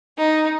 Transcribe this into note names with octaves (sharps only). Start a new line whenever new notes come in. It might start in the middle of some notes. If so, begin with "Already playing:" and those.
D#4